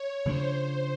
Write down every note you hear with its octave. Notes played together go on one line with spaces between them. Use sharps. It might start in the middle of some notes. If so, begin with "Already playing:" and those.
Already playing: C#5
C#3 F3 A#3 D4 C5